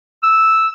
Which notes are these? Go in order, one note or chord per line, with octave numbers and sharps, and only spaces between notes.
E6